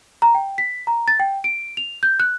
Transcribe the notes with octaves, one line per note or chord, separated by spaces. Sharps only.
A#5
G5
B6
A#5
A6
G5
D7
F7
G6
F#6